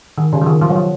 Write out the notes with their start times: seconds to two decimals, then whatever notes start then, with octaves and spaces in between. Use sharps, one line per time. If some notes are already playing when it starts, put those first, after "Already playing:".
0.18 D#3
0.33 C#3
0.42 F3
0.47 D#3
0.61 F3
0.69 F#3
0.76 F3